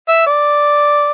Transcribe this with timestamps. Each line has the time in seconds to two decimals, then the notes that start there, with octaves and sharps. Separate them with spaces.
0.09 E5
0.27 D5